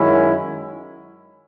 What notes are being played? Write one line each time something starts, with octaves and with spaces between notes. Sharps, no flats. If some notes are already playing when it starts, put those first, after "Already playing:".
Already playing: F#2 D#3 G#3 C#4 E4